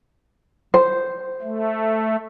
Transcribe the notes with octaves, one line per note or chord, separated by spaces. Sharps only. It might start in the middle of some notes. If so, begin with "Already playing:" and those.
C5
A3